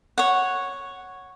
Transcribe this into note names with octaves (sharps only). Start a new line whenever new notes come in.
C#5 F#5